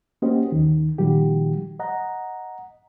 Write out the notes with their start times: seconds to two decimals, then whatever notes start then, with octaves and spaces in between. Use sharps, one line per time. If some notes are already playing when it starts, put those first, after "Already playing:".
0.22 A#3 C#4 F#4 G4 C5 D#5
0.52 D#2 D#3
0.98 A#2 D#3 F3 G3 F#4 G4
1.79 D#5 F#5 A#5